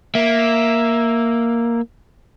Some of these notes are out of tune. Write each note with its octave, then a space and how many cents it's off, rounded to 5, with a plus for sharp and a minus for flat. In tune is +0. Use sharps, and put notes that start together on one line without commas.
A#3 +0 E5 +5